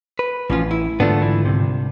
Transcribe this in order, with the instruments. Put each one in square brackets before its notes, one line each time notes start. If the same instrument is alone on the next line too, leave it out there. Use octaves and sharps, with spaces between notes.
[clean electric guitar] B4
[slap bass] A1 [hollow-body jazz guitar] F3 C#4 F4
[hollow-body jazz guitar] E4
[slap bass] G#2 D3 D#3 [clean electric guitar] A3 B3 [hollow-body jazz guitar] D4 F4
[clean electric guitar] E3
C2 F2 C3